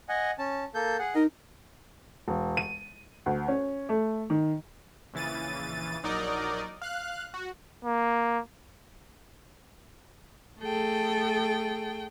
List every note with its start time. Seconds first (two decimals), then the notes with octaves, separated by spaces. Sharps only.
0.09 D#5 F#5 G#5
0.39 C#4 A5
0.75 A#3 A4 G6
0.99 G#4 F#5
1.15 D#4 A#4 D#5
2.28 E1
2.57 D#7
3.26 D2
3.48 C#4
3.89 A3
4.30 D#3
5.13 A#1 C#3 E3 A6 D#7
6.03 A#1 F#3 D#4 A#4 D5 D#5
6.82 F5 F#6
7.34 F#4
7.85 A#3
10.60 A3 G#4 A4 G5